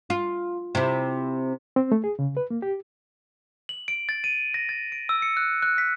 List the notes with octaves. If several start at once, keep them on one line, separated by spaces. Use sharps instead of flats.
F4
C3 E4
C4
A3
G#4
C#3
B4
A#3
G4
F#7
D7
A6
D#7
A#6
A6
D7
E6
C#7
F#6
F#6
B6